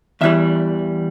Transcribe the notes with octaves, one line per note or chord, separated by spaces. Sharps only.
E2 E3 G3 E5